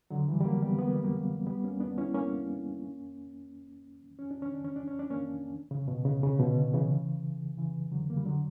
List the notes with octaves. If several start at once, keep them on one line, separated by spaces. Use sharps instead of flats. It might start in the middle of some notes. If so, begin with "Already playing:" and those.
D3 F#3
E3 G3
G3
F#3 A#3
G3 B3
B3
A#3
G3
F#3 A#3
G3 B3
A#3 C#4
B3 D4
C#4 E4
A#3 C#4
C#4
D4
C#4
D4
C#4
D4
C#4
D4
A#3 C#4
C#3
B2
C#3
C#3
B2 D3
C#3 E3
C#3 E3
D3 F#3
A#3
G3
D3 F#3